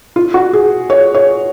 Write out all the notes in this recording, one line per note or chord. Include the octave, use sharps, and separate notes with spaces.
F4
F#4
G#4
C#5
C#5